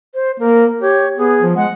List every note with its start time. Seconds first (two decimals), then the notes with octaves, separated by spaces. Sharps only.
0.14 C5
0.40 A#3 A#4
0.81 G4 C#5
1.18 B3 G#4
1.41 F3
1.56 G#3 F#5